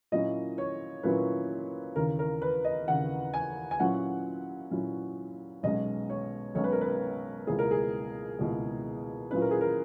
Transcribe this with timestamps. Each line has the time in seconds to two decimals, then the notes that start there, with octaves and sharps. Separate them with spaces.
0.12 A#2 F#3 A#3 C#4 E4 D#5
0.58 C#5
1.03 A#2 F#3 A#3 C#4 E4 B4
1.96 D#2 C#3 E3 A#4
2.19 A#4
2.42 B4
2.65 D#5
2.87 D#2 C#3 E3 F#5
3.34 G#5
3.71 G#5
3.80 A#2 F#3 C#4 E4 F#5
4.71 A#2 F#3 C#4 E4
5.63 B1 B2 G#3 C#4 D#5
6.10 C#5
6.55 B1 B2 G#3 C#4 C#5
6.64 B4
6.72 A#4
6.81 B4
7.47 C#2 B2 A#3 E4 G#4
7.59 A#4
7.71 G#4
8.39 C#2 B2 A#3 E4
9.31 A#2 F#3 C#4 E4 B4
9.42 A#4
9.51 G#4
9.61 A#4